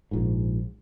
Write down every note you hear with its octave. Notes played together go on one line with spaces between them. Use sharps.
A#1 G#2